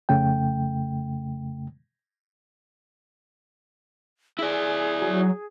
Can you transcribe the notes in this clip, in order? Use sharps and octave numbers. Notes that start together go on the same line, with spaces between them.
F2 C#3 A3 G5
E4 G#4 D5
F#3